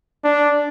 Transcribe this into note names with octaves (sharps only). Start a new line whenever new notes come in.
D4